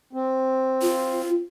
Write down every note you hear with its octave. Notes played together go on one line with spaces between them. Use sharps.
C4
F4